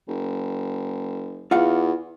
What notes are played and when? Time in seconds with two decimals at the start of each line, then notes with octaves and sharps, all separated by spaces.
0.08 F#1
1.51 E2 F4 F5 F#5